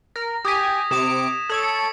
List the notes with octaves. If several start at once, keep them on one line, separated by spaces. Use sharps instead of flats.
A#4 A#6
G4 G#5 D#6 G#6 B6
C3 D6 D#6 C#7 E7
A4 C#5 E6 D7
C#7